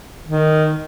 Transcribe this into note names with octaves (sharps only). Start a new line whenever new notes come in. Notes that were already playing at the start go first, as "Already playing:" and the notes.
D#3